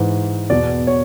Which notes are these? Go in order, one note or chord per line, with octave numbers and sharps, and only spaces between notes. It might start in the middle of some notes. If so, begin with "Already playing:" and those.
Already playing: G#2 E3
E2 B2 D5
C#5